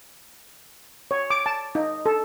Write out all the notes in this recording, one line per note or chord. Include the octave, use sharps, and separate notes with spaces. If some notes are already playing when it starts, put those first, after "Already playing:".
C#5
D6
A5
D#4
A4